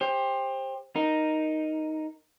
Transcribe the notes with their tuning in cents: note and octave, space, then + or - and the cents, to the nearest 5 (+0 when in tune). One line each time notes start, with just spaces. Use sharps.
G4 +20 C5 +20
D#4 +0 A#4 +0